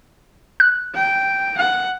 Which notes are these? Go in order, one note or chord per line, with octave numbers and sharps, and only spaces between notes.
F#6
G5
F#5